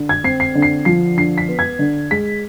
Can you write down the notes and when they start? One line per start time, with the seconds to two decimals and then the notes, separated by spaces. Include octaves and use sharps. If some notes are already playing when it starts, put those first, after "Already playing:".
Already playing: D3
0.09 G#6
0.24 C4 C7
0.40 C7
0.55 D3
0.62 C7
0.85 F3 C7
1.17 D3 C7
1.38 B6
1.48 B3
1.59 G#6
1.79 D3
2.11 G#3 B6